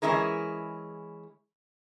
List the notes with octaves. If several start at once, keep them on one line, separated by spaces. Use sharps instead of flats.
E3 G#3 C#4 E4 G#4 A#4